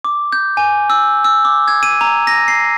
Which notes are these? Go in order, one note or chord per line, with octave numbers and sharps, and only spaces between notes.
D6
G6
G#5
E6
E6
D6
G#6
D#7
A#5
A#6
C7